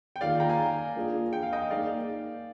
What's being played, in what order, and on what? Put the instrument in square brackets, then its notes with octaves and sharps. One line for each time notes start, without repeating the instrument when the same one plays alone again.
[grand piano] G5
[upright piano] D#3 A#3 F4 G#4 [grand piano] D5 F5
[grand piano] G5 A#5
F5 G#5
[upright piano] A#3 D4 F4 G#4 D5
[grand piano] G5
F5
D#5 G5
[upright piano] A#3 D#4 G#4 [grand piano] D5 F5